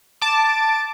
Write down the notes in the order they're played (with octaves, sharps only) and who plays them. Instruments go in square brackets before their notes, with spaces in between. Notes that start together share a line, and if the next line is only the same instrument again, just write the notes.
[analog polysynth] A5 D6